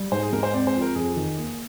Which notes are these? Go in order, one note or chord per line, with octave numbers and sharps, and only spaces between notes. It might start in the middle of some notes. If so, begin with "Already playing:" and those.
Already playing: G3
G#2 C5
G#4
G#3 A#4
C5
C4 D5
C5
F3
A#4
F2 G#4
D#3
A#3